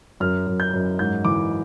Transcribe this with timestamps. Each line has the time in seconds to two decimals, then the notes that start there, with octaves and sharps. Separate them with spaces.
0.20 F#2 F6
0.47 F#2
0.60 G6
0.73 F#2
0.99 G#2 G6
1.25 E3 D6